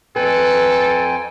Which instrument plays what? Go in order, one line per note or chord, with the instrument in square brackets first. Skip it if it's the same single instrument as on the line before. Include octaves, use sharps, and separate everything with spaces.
[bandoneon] F2 G5 G#5 [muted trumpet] A4 [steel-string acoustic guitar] B4